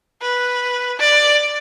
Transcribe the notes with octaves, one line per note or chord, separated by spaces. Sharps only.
B4
D5